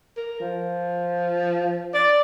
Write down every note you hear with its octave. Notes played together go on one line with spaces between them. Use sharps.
A#4
F3
D5